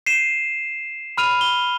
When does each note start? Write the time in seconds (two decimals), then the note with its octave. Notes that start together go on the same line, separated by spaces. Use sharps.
0.06 C7 D#7 E7
1.18 B5 F6 D#7 F7
1.41 G7